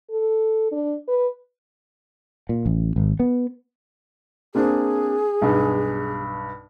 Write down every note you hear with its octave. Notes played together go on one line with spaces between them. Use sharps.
A4
D4
B4
A#2
A1
G#1
B3
A#3 C4 D4 G#4
B1 G2